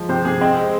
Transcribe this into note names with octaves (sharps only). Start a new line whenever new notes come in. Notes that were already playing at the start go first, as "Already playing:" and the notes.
Already playing: F3 G#3
C3 C5
C3 G#4
C4 D#5
G#3